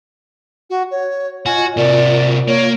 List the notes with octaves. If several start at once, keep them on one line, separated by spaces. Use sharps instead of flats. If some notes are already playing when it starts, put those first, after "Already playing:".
F#4
C#5
F4 F#4 D#5 G#5
C3 F4 F#4 A#4 D5
A#3 C#5